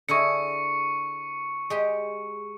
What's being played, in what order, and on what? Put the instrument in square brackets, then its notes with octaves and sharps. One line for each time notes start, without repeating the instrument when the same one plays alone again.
[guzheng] D3 E4 G#4 [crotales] C#6 C#7
[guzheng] G#3 G4 C6